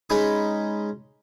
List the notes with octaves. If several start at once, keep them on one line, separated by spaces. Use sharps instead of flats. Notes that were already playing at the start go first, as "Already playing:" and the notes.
G#3 C#4 D#4 B5 D#6